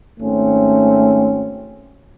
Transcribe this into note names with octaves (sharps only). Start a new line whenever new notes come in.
G#1 A3 C4 C#4